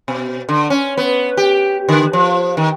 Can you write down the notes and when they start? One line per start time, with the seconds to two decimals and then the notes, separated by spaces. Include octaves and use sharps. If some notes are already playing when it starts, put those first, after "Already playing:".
0.08 B2
0.49 D3
0.70 C#4
0.97 B3
1.37 G4
1.89 D3
2.13 F3
2.57 D#3